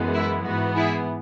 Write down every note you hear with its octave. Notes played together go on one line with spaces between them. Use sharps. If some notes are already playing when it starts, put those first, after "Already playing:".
Already playing: F#2 E3 G#3 B3
E4
G#2 E3 B3 F#4
E4 G#4